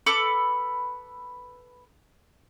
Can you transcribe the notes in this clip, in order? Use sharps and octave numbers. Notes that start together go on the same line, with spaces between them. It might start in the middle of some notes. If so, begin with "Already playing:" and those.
A4 B4 B5 D6